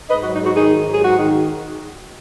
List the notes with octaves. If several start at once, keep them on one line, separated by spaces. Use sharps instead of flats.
G#2 B4 D#5
F#4
F#3
D#4
G#2 F#4
D#3 D#4 G#4
G#2
F#3
G#4
G#2 F#4
D#3